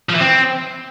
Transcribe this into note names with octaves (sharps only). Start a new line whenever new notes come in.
F3
E3
C4